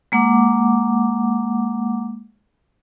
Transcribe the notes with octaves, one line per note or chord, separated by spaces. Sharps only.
G#3 A#3 F#5 D6